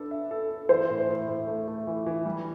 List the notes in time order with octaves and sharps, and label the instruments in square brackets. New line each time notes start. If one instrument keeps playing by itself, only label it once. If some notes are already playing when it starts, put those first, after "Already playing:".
Already playing: [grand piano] B3 D4 A4
E5
A4
A4
[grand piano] E3 [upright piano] C5
[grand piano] A2
A2
A2
A3
A3
E3
E3
G3